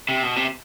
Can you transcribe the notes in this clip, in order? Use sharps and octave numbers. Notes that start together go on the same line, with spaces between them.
C3
B2
C3